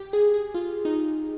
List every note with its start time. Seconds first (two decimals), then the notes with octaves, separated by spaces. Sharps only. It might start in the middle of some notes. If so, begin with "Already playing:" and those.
Already playing: G4
0.13 G#4
0.34 G#4
0.54 F4
0.85 D#4